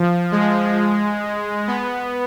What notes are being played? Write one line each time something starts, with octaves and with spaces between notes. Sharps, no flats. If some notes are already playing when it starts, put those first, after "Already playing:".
Already playing: F3
G#3
B3